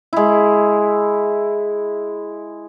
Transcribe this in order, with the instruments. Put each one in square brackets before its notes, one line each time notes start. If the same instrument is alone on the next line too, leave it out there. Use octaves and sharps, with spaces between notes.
[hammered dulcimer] G#3 E4